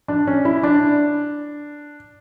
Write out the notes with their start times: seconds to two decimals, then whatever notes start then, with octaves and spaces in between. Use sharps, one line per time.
0.08 D4
0.27 C#4
0.45 E4
0.63 D4